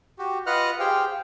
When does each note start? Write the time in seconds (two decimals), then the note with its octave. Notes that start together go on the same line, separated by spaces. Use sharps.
0.19 F#4 G4
0.47 F4 B4 D#5 F#5 F6 F#6
0.80 G4 G#4 C5 F5 G5